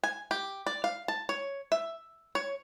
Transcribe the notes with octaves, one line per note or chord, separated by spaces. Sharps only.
G#5
G4
D5
F5
A5
C#5
E5
C#5